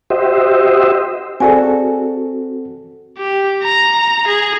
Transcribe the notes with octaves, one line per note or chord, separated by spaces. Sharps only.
F#4 G4 C5 D#5 E5
C4 F#4 G#4 A4 D5 G#5
G4
A#5
G#4